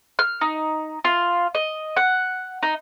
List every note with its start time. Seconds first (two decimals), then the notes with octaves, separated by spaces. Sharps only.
0.19 F6
0.41 D#4
1.05 F4
1.55 D#5
1.97 F#5
2.63 D#4